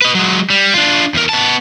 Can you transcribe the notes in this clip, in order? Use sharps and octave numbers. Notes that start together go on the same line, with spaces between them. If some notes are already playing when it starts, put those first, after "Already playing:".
B4 D#5
F#3 G#3
G3
D4 F4
E2 A#4
B3 A5